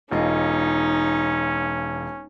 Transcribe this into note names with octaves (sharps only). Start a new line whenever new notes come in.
E1 C#4 D#4 F4 D#5